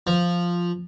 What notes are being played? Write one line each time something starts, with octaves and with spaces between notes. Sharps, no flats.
F3